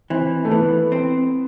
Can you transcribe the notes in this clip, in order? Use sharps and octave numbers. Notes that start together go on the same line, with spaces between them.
E3 C4
A3
E3 B3
C4